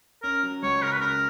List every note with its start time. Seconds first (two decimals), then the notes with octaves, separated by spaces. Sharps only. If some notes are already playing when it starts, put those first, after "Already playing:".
0.23 C#4 A#4
0.43 F#3
0.63 C#2 C#5
0.82 C#3 A#4
0.92 B4
1.01 C#4 A#4